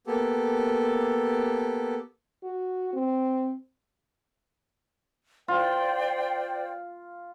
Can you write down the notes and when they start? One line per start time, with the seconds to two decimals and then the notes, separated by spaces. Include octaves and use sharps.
0.07 A#3 B3 G4 A4
2.43 F#4
2.93 C4
5.48 F4 C5 D5 G5